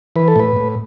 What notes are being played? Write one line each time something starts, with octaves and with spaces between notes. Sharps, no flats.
E3 B4
A4
A2 B4
A2